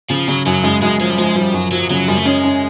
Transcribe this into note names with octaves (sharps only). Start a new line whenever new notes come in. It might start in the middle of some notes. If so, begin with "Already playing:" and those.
C#3 F3
C#3 F#3
F#2 F#3
F#2 G#3
F#2 G#3
F3 G#3
G3
F3 G#3
F3 G3
F#2 F#3
F3 F#3
C#3 F#3
F#2 G3
A3
G#3 C#4
C#4